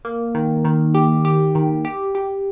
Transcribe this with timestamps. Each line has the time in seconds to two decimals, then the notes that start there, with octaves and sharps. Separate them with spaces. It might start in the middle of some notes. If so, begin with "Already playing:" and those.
0.05 A#3
0.35 D#3
0.65 D#3
0.94 G4
1.25 G4
1.55 D#3
1.85 G4
2.15 G4